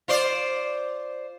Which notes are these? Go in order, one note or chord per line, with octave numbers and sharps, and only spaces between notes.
F4 C5 D5